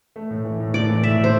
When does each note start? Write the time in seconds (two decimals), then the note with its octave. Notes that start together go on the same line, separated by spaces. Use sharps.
0.16 A3
0.30 A2
0.45 E3
0.60 A2
0.74 A2 D5
0.88 E3
1.04 A2 E5
1.18 A2
1.24 C5